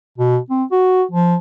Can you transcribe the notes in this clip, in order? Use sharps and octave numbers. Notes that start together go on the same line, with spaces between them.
B2
C4
F#4
F3